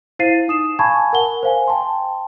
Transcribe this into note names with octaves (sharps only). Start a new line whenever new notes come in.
E4 C5 F5 A6 C7 D#7
D#4 D#6 E7
F5 G#5 A5 B5 C#6 G#6
A#4 F#5 G7
C5 F5 G#5
G5 A5 C6